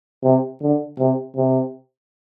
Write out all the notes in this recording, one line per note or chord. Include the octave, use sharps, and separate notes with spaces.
C3
D3
C3
C3